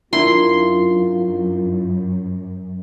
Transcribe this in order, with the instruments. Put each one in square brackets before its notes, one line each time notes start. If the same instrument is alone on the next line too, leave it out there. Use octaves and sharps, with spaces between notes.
[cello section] F#2 [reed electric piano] D4 E4 A#4 [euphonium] F4 [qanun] C6